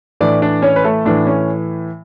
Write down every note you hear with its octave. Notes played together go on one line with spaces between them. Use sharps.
A2 E3 D4 D5
D4 D5
C#4 C#5
B4
A3 A4
A2 E3 D4
C#4